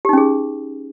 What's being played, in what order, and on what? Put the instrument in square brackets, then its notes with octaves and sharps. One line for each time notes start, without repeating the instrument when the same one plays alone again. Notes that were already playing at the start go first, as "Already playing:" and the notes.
[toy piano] G4
D#4
C#4
G#4